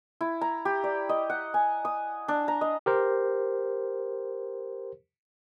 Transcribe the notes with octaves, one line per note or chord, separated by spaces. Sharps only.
E4
A#5
G4
D5
D#5
F#5
G#5
D#6
D4
A#5
D#5
G4 A#4 C5